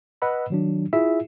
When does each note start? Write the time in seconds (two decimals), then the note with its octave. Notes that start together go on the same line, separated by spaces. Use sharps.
0.22 B4 D#5 F#5 B5 E6
0.50 D#3 F#3 D4
0.93 E4 F4 G#4 E5